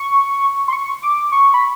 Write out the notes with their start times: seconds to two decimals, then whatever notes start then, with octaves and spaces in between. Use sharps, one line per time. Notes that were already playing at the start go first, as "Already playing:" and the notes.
Already playing: C#6
0.68 C6
0.73 C#6
1.03 D6
1.32 C#6
1.54 B5